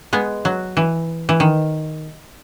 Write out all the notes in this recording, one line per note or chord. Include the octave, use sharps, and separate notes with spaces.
G#3 B3
F#3
E3
E3
D#3